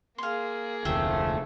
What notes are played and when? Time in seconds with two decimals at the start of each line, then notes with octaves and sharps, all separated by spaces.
0.18 A#3 G#4 F5 C6
0.85 F1 D2 F3 A3 E5 G5